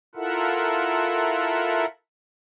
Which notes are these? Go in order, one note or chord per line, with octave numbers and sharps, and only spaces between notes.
E4 F4 A4 A#4 E5 F#5